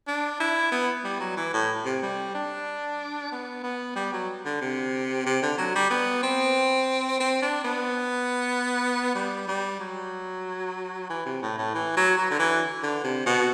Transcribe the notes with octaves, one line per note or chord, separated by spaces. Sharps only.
D4
E4
B3
G3
F#3
E3
A2
C3
G3
D4
B3
B3
G3
F#3
D3
C3
C3
D3
F#3
G3
B3
C4
C4
D4
B3
G3
G3
F#3
E3
C3
A2
A2
E3
F#3
F#3
D3
E3
D3
C3
B2